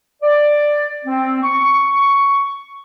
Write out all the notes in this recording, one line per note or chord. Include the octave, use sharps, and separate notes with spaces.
D5
C4
C#6